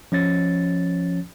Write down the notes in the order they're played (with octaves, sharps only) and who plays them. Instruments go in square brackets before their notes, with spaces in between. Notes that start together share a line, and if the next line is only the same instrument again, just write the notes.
[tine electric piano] F3 C#4 C#5 A6